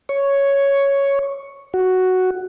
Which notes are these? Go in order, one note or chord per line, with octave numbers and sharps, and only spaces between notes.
C#5
F#4